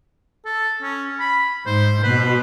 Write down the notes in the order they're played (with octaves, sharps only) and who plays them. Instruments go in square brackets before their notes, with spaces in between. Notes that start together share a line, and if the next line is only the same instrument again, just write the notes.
[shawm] A4
C#4
B5
[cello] G#2 [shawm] C5
[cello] B2 [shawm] B4